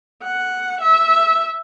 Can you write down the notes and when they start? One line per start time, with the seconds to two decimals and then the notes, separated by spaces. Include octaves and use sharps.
0.23 F#5
0.81 E5